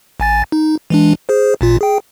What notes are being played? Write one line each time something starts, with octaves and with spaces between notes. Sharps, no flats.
A1 G#5 A6
D#4
E3 G#3 D4
G#4 C5
A1 A#2 F4
G#4 G5